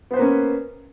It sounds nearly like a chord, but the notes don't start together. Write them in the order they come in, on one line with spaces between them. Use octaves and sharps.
B3 C5 B4 A#3 C#4